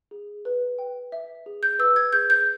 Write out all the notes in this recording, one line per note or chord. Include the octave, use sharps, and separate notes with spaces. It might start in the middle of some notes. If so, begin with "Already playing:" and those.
G#4
B4
G5
E5
G#4
G6
B4 E6
G#6
G#4 G6
G6